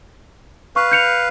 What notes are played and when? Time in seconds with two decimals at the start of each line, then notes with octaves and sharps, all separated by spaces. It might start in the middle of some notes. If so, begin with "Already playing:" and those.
0.76 B4 F5 C#6
0.91 G6 C#7 F7